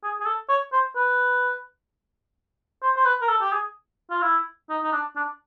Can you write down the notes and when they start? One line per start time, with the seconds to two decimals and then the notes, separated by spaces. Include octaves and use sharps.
0.03 G#4
0.20 G#4
0.26 A4
0.49 C#5
0.72 C5
0.96 B4
2.82 C5
2.96 C5
3.05 B4
3.22 A#4
3.29 A4
3.41 G4
3.52 G#4
4.10 F4
4.22 E4
4.69 D#4
4.83 D#4
4.92 D4
5.16 D4